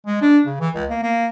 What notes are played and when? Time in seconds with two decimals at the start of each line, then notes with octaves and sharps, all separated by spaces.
0.07 G#3
0.22 D4
0.46 C#3
0.60 E3
0.75 C#2
0.89 A#3
1.03 A#3